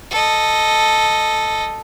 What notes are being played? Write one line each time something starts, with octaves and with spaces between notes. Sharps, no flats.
A4 D#5